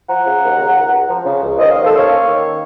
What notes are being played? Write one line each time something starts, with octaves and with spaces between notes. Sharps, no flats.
F3 F#5 A#5
C#3
D#2
C#3
C#2
C#2
F3
C#3
C#2
D#3 C5 D#5
C#5 F5
D#2
A4 C5
C#4 C#5 F5
A#3
D#3